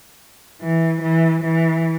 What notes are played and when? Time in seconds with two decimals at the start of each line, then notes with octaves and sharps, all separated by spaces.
0.62 E3
1.02 E3
1.44 E3